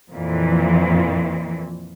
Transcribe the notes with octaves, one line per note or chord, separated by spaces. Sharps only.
F2 A#2 E3